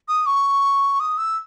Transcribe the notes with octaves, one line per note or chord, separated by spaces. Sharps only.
D#6
C#6
D#6
E6